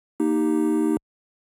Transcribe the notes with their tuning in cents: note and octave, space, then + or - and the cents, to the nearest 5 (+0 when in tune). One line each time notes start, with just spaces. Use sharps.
A#3 +0 D#4 +0 G4 +0